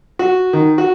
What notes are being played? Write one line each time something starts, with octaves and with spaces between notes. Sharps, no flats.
F#4
D#3
F#4